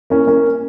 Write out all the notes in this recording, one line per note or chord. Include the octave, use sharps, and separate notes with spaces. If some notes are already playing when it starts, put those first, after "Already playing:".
A#3 C#4
A#3 C#4